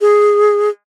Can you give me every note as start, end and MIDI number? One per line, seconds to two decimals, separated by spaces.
0.01 0.69 68